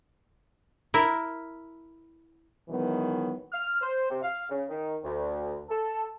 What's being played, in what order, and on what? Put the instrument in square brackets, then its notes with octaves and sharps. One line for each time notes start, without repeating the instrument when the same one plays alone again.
[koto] E4 A#4
[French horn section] B2 D#3 E3 F#3 G#3 B3
[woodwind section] F6
C5
C3
F5
C#3
D#3
D2
A4